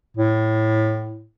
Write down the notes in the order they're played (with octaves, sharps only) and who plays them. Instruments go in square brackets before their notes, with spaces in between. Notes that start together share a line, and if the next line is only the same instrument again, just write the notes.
[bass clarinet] A2